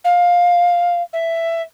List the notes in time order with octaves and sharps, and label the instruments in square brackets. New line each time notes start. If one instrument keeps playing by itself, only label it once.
[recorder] F5
E5